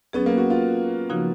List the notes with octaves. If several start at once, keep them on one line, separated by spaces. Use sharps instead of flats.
F#3 B3 C#4 G#4
A#3
F#4
F4
C#3 F3 A#3 D#4 F#4